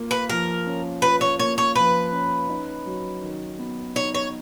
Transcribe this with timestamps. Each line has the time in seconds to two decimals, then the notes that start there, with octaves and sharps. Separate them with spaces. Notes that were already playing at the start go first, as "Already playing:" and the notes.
Already playing: A#3 F4
0.11 B4
0.29 F3 A#4
0.66 C#4
1.02 F4 B4
1.21 C#5
1.39 A#3 C#5
1.58 C#5
1.75 F3 B4
2.12 C#4
2.49 D#4
2.86 F#3
3.22 D#3
3.59 B3
3.95 D#4 C#5
4.14 C#5